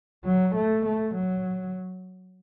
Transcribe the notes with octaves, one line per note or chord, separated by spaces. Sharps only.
F#3
A3
A3
F#3